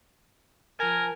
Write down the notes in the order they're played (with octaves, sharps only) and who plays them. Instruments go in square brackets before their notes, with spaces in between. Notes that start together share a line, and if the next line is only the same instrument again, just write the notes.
[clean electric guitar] F3 G#5 [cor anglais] A#4